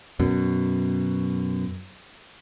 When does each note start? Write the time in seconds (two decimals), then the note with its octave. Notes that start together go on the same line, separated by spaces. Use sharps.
0.20 F#2 B2